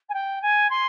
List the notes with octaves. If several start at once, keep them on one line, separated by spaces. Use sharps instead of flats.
G#5
G5
G#5
C6